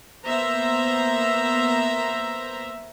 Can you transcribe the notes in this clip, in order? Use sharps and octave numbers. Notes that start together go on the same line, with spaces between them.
A#3 B3 C5 E5 A#5